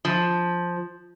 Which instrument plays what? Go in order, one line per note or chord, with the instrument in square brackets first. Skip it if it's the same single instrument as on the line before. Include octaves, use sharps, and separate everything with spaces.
[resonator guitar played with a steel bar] F3